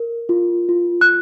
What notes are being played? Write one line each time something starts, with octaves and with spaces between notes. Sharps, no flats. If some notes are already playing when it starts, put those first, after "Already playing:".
Already playing: A#4
F4
F4
F#6